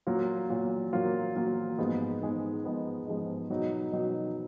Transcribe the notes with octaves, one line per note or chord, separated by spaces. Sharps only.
A#2 F#3 A#3 F4
A#2 F#3 A#3 F4
A#2 F#3 A#3 F4
A#2 F#3 A#3 F4
G#2 F3 G#3 B3 D#4
G#2 F3 G#3 B3 D#4
G#2 F3 G#3 B3 D#4
G#2 F3 G#3 B3 D#4
B2 F#3 B3 D#4
B2 F#3 B3 D#4